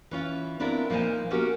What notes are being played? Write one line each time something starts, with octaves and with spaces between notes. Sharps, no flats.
E3 C#4 F4
B3 C4 D4 E4 F4 A#4
A#2 F3 A#3 D#4 C5 G#5
B3 C#4 F#4 G4 A#4